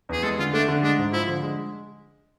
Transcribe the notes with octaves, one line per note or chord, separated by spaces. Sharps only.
E2 G#4
G#3 A4
D3 F4
A3 D4
D3
G#3 D4
G#2
F3 E4
D3
G#3